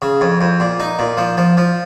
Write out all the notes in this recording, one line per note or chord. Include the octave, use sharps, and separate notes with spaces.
C#3
F2
F2
A#2
D#4
A#2
F3
F3
F3